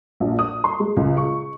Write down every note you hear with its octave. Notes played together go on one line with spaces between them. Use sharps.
A#1
D#6
C6
G#3
C#2
C#6